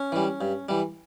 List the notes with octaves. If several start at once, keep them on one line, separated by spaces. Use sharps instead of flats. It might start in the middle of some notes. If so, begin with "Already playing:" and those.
Already playing: C#4
E3 G3
G2
E3 G3